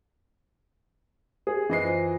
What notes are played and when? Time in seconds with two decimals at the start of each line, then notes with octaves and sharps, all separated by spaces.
1.47 G#4
1.70 F#2 E3 C5 D#5 F#6 C7
1.84 F4 C5